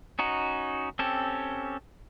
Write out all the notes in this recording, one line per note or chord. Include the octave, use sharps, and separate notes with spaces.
C#4 D#4 F#4
C4 C#4 G4 A4